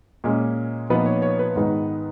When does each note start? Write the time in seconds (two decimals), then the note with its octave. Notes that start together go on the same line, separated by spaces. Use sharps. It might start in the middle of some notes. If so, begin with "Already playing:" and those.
0.24 A#2 G#3 C#4
0.90 A#2 F3 B3 D#4 B4
1.06 C#5
1.22 C#5
1.39 B4
1.56 G#2 D#3 G#3 B3 D#4